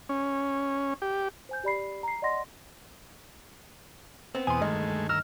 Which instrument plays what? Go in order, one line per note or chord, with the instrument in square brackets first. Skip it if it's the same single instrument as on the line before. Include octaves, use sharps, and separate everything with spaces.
[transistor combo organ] C#4
G4
[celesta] C5 G#5 G6
G4 D5 B5 C7
A#5 C7
D5 D#5 F#5 C6 A#6
[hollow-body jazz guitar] B3 C4
[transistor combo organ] E2 B2 D#6 [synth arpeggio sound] G#5 C6
[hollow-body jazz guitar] D2 G2 D#3 [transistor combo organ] G#3 A3 [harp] D#5
[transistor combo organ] A#5 E6 [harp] F6